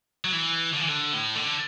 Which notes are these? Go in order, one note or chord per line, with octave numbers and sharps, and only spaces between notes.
F#3
E3
D3
E3
D3
A2
D3